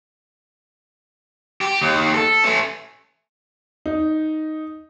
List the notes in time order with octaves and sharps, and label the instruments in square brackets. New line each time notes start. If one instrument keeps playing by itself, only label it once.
[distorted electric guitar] G4
D#2
A4
A3 C#4
[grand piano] D#4